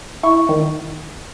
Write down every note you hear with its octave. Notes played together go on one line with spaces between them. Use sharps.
E4 C#6
D#3